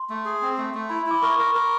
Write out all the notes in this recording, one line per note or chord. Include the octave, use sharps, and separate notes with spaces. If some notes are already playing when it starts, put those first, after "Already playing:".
Already playing: C6
A3
G#4
C4
A3
A3
E4 B5
E4 D6
A#4 C#6
A#4
A#4